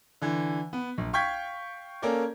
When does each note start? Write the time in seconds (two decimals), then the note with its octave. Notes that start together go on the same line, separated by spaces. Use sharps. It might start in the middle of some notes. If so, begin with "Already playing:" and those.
0.22 D3 E3
0.73 B3
0.98 A#1
1.13 F5 G5 C#6 G6 G#6 B6
2.02 A#3 C#4 A4 A#4 D5